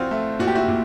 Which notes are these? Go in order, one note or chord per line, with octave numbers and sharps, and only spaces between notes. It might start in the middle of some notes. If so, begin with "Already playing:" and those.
Already playing: F3 C4 F4 F#4
A3
A#2 F#4
G4
E4 F#4
A#2